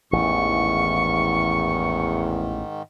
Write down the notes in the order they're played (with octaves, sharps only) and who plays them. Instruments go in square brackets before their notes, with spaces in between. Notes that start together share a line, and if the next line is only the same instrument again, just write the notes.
[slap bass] A1 [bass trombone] E2 [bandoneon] G#2 D#3 [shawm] C#6